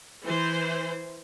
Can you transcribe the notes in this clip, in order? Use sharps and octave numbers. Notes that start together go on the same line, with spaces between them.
E3 C5